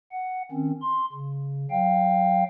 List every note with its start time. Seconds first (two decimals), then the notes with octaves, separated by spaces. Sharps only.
0.12 F#5
0.51 D#3 C4 C#4
0.82 C6
1.13 C#3
1.71 F#3 F5 G5